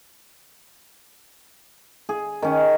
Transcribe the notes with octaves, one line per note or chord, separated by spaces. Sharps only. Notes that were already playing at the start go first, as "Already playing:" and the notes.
G#4
D#3 C#4